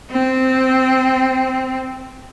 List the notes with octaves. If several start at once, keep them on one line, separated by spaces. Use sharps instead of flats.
C4